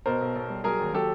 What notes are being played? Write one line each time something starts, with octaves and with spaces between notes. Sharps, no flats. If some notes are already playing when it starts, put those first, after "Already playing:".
B2 A#4 C5
B1
B1
G3
F#3 G#4 A#4
D#2
F#3 G4 A4